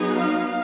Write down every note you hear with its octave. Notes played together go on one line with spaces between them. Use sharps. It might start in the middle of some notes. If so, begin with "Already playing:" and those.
Already playing: F#3 B3 D#4 G#4
F5